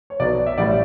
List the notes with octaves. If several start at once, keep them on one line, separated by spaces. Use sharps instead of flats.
C#5
B1 B2 F#3 D5
E5
A1 A2 G3 D5